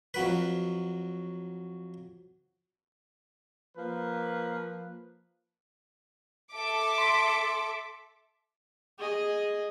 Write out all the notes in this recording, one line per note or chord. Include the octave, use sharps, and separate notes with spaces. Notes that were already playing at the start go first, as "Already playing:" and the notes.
F2 F#3 B4
F3 A#3 B4
A4 E5 D6
C6 B6
G#4 D#5